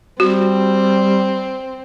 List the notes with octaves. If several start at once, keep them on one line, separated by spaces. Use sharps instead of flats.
G3 C4 F#4